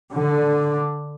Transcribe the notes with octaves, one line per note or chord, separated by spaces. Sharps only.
D3